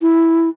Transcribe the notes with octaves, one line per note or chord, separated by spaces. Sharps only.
E4